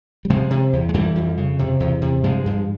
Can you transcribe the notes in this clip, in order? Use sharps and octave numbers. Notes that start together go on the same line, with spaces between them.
G3
C3 F3 G#3
C3
E2
G#3
F2 E3 G3
F2
C#3
C3
E2
C3
G2 F3 G#3
G2